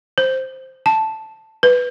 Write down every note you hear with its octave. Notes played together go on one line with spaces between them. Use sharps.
C5
A5
B4